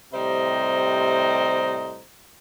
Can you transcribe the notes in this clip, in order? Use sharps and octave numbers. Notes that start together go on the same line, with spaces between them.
A2 C3 G3 C5 D#5 A#5